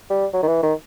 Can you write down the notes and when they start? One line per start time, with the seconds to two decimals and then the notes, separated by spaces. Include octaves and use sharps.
0.10 G3
0.33 F#3
0.43 D#3
0.48 E3
0.63 D#3